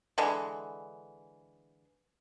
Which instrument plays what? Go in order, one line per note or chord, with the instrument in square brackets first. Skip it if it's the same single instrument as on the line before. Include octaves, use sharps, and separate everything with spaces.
[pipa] D3 E3 G#3